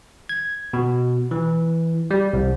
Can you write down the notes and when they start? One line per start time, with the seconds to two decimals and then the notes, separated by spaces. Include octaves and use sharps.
0.29 G#6
0.73 B2
1.31 E3
2.11 G3
2.33 C2